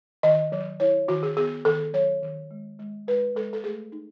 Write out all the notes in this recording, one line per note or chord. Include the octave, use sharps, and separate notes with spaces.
D#3 D#5
F#3
E4 C#5
D#3 F#4
G#4
B3 G#4
D#3 A4
F#3 C#5
D#3
G#3
G#3
G#3 B4
G#3 A4
A4
A3 G#4
D#4